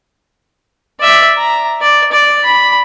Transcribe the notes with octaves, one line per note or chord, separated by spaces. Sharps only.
D5 E5
A#5
D5
D5
B5